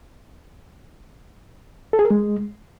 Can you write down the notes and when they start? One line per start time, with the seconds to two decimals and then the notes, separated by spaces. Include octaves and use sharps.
1.93 A4
1.99 G#4
2.05 A#4
2.10 G#3